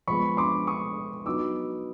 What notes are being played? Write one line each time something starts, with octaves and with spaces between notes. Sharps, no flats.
F3 G#3 B3 B5 C#6
C6 D6
C#6 D#6
F#3 B3 D#4 D6 E6